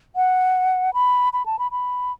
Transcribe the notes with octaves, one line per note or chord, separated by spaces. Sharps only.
F#5
B5
B5
A5
B5
B5